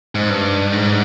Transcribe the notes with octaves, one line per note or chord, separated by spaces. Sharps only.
G#2
G2
G#2